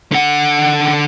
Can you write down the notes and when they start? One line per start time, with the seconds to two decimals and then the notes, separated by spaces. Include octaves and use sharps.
0.12 D3 F#5